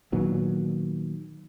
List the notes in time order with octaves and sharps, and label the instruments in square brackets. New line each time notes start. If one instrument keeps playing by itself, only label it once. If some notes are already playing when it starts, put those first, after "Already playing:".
[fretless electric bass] A#2 D#3 F#3 B3